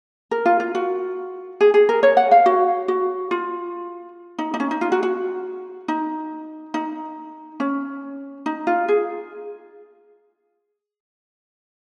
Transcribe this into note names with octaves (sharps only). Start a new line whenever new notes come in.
A#4
F4
F4
F#4
G#4
G#4
A#4
C#5
F#5
F5
F#4
F#4
F4
D#4
D#4
C#4
D#4
F4
F#4
F#4
D#4
D#4
C#4
D#4
F4
G#4